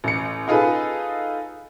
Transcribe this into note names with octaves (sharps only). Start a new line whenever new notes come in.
A1 C#7
D#4 F4 G#4 A4 B4